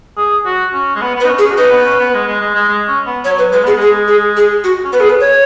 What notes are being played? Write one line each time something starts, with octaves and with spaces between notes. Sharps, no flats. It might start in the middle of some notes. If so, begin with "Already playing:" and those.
G#4
F#4
C#4
G#3
B3
B3 B4
D#4
C#4
G#4
C#4
F#4
D#4 B4
B3
C#4
B3
G#3
G#3
G#3
G#3
G#3
C#4
B3
F#3 C#5
B4
G#3 B4
B3 G#4
G#3 G#4
G#4
G#4
F#4
C#4
B3 B4
G#4
B4
C#5